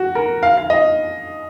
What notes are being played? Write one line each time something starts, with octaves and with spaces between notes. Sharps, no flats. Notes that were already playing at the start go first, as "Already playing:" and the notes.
Already playing: F#4
A#4
F5
F5
D#5